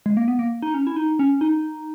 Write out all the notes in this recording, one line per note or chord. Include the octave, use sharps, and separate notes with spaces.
G#3
A#3
B3
A#3
D#4
C#4
E4
D#4
C#4
D#4